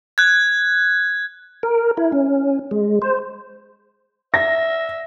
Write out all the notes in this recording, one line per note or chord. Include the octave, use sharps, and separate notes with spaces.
F#6 G#6
A#4
E4
C#4
G#3
C5
E5 A#6